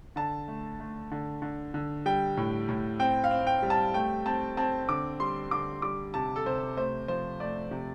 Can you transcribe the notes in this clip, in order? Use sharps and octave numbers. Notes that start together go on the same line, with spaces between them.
D3 A5
A3
A3
D3
D3
D3
G3 G5
A2
A2
C4 G5
F5
C4
G5
G3
A5
A3 G5
C4 A5
C4 A5
D3 D6
G3 C6
D3 D6
G3 D6
C3 A5
A4
C3 C5
A3 C5
F3 C5
A3 D5
C3